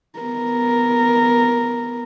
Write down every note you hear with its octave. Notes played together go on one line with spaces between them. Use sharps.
B3 A#4